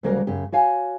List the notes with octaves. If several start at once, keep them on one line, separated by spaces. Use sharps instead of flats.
D2 C#3 F#3 G3 A#3 A#4
F#2 C#3 G4
F#4 C#5 F5 G#5